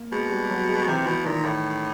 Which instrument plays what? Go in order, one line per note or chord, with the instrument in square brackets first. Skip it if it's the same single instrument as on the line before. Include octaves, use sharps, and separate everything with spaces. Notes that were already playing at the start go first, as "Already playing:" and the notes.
Already playing: [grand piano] A#3
[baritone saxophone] B2 [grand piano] G#3
[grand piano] G3
F#3
G#3
[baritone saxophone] C3 [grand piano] E3
[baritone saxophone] B2 [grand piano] E3
[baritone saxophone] A#2 [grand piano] D#3
[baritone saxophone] A2